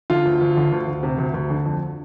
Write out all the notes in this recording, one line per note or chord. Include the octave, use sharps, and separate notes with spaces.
D3 F4
D2
D2
D3
D2
D2
C3
D2
D2
D3
F2